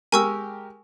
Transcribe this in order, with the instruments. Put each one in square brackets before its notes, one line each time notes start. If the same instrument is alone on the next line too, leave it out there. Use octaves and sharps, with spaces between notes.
[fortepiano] G#3 G4 A#4 [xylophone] G#5 C#6 E6